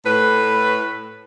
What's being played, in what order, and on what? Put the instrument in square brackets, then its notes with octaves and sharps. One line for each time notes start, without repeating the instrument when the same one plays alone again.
[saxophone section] A2 B4